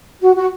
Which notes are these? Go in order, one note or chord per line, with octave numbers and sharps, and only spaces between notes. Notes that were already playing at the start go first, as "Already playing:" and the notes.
F#4
F#4